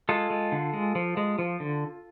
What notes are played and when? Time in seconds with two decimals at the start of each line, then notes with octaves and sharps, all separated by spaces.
0.09 G#3 F4 A4
0.30 G#3
0.52 D3
0.73 G#3
0.95 F3
1.17 G#3
1.39 F3
1.60 D3